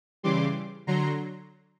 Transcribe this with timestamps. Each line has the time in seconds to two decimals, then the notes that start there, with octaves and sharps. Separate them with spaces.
0.23 C#3 E3 G3 C6 D6
0.87 D3 F#3 A#5 C6